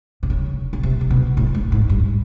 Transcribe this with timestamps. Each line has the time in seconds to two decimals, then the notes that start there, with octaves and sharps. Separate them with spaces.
0.23 C3
0.30 C#3
0.73 C#3
0.83 C3
1.01 C3
1.11 B2
1.37 A2
1.55 G#2
1.72 G#2
1.90 G2